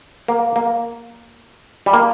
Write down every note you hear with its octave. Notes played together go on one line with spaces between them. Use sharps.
A#3
A#3
G3
A#3